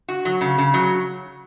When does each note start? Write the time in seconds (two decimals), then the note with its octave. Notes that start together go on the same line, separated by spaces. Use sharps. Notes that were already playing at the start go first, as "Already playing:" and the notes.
0.08 F#4
0.25 F#3
0.41 C#3
0.58 C#3
0.74 F#3